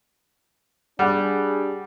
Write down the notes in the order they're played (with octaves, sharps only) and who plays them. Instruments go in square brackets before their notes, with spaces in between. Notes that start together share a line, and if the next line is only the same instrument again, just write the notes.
[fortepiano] G3 [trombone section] D4 G4 G#4 [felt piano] F#5